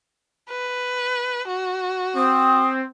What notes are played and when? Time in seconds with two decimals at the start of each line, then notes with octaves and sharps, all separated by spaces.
0.50 B4
1.48 F#4
2.15 C4 D#6